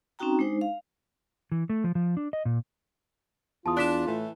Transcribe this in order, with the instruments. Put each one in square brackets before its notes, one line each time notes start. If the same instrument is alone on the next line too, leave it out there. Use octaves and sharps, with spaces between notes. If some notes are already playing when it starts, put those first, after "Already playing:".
[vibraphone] C4 C#4 D#4 F#4 G5 A#5
G#3 D4 D#4 C5
F5
[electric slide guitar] E3
A3
F3
F3
D4
D#5
A#2
[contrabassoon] E2 [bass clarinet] F4 [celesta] A5 D#6
[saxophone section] D4 [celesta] F#6 B6
[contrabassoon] A2 [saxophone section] E3 A3